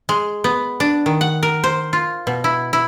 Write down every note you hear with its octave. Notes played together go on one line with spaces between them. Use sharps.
G#3
B3
D4
D#3
F#5
A#4
C5
F4
B2
E4
E4